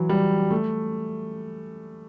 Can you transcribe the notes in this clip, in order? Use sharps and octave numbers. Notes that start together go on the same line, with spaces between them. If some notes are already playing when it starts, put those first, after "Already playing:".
Already playing: E3 F#3
G3
A3